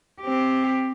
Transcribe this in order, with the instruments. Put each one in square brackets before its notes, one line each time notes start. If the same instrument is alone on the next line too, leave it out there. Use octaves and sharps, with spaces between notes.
[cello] C4 G4